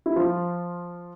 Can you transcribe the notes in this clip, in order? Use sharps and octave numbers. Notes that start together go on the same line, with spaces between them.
E4
F3 F4